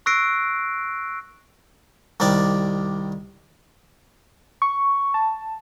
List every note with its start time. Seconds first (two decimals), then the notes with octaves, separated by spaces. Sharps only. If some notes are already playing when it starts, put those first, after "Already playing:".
0.06 C#6 E6 F#6 A#6 C7 D7
2.20 C2 D#3 G3 D5
4.62 C#6
5.14 A5